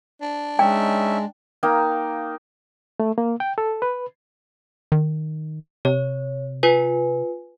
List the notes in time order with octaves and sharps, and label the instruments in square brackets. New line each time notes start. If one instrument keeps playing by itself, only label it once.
[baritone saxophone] D4
[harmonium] G#3 [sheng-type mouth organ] C#4 D#4 E5 [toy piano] G5
[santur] A#3 D#4 F5 G5
[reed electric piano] A3
A#3
G5
A4
B4
[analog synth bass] D#3
[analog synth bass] C3 [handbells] C#5
[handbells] F4 B4 G#5